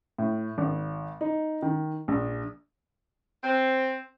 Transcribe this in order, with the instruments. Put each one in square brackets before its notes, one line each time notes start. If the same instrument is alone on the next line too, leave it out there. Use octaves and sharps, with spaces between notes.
[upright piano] A2
G#1
D#4
D#3
A#1
[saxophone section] C4